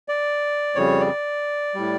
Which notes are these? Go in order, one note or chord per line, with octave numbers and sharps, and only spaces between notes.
D5
F2 C#3 G3 C#5
D5
A2 G3